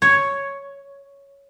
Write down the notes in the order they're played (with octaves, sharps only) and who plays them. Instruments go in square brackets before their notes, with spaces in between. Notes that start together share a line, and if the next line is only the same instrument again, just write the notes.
[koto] C#5